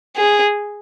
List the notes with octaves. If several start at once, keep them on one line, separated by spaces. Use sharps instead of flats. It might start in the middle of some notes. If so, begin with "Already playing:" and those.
G#4